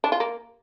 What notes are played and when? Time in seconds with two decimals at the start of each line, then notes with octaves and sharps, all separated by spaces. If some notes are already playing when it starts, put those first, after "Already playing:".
0.04 D4
0.12 F4
0.20 A#3